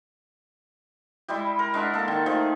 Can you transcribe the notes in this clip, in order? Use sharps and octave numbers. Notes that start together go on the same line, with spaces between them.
G3 G#3 E4 G4
A#4
G#3 D4 E5 F#5
A#3 A4
D#3
D#3 F3 A3 G#4